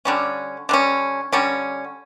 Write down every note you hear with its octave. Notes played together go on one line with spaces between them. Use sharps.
D3 G3 C#4
D3 G3 C#4
D3 G3 C#4